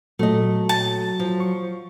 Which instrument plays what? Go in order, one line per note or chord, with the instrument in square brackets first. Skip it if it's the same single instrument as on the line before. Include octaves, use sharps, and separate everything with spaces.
[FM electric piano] A#2 [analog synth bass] F#3 [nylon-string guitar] A3 D#5
[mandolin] A5
[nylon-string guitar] F3
[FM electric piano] C#6